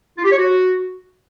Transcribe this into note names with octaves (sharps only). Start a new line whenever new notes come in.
F4
G4
C#5
F#4